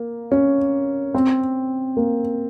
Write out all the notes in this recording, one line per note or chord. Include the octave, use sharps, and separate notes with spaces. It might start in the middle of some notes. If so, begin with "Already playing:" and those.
Already playing: A#3
C#4
C4
A#3